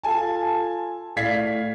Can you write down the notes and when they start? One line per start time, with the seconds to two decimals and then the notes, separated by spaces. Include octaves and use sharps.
0.03 F4 A4 G#5 A5
1.16 A2 D5 F5 G#6 B6 C7